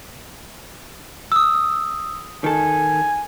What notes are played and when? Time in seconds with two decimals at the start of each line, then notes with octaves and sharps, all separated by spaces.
1.32 D#6 E6
2.44 D#3 A4 G#5